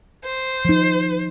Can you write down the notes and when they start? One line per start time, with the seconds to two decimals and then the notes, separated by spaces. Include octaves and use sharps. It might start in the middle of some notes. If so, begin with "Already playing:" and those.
0.24 C5
0.65 F3 D#4